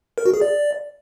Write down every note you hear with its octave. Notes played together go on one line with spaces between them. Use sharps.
A#4
F#4
G#4
D5